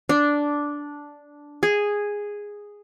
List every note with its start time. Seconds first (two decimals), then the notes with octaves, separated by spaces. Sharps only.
0.09 D4
1.63 G#4